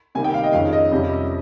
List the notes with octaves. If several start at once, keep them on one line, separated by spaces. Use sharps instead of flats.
C3 D#3 G3 A#3 G#5
G5
F5
D#5
F2 D#3 G#3 C#4 F5
D#5
F2 C3 G3 C#4